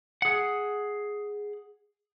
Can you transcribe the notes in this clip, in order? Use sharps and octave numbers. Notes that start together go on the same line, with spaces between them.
G#4 F#5